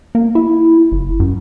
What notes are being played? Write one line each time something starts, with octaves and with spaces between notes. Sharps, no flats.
A#3
E4
F#1
F#2